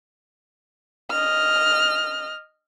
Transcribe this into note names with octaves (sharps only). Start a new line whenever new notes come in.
D#5 F6